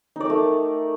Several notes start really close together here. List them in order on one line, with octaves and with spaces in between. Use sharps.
D#4 D5 A#4 A3